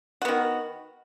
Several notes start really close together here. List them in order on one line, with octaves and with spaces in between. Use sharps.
F#4 B3 D#3